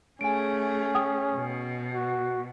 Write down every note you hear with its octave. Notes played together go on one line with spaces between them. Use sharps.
A3 C#4 G#4 G#5 D7
G5 D#6
B2
F#4